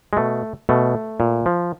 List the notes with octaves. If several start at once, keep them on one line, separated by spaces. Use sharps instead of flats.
G#3
B2 A3
B2 A3
A#2
F3